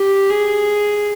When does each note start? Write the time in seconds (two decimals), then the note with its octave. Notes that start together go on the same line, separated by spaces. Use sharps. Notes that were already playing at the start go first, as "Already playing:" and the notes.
Already playing: G4
0.30 G#4